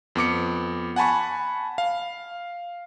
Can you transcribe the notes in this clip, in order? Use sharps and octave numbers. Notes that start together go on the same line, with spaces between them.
F2 B3 D6 C#7
F#5 G#5 A5 B5 C#6
F5